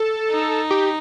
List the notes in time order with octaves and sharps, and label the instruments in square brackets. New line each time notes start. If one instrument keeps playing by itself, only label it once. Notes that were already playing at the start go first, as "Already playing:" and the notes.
Already playing: [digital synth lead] A4
[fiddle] D#4
[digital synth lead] G4